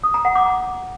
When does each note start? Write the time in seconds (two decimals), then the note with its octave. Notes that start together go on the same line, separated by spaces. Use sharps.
0.03 D#6
0.14 A#5
0.25 F#5
0.35 D6
0.46 A#5